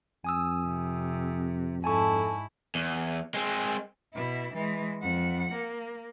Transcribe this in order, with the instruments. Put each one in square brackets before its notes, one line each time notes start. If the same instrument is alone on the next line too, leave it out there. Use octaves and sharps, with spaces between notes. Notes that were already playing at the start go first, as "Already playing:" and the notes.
[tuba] F2 [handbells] G#5 D#6 E6
[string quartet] C3
[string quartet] G#2 E4 [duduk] A4 [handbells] G#5 A5 C#6
[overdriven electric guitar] E2
G#3 C4
[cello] B2 E4
E3 G#3
F2 F#5
A#3